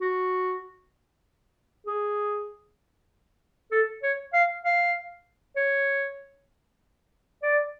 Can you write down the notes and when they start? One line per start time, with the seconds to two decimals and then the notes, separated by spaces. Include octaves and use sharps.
0.01 F#4
1.87 G#4
3.71 A4
4.03 C#5
4.33 F5
4.65 F5
5.56 C#5
7.43 D5